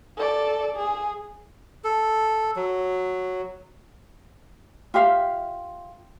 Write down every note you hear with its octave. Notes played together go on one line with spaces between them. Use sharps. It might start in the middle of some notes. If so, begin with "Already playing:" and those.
A4 D5
G#4
A4
F#3
F4 G4 E5 F5